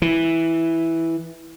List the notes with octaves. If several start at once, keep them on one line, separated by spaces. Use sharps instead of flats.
E3